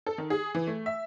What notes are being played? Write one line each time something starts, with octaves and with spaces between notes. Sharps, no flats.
A4
D#3
G#4
E3
A3
E5